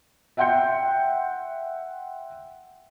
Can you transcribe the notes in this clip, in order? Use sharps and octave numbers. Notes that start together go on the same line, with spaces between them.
E5 F#5 G5 C6 G6 C#7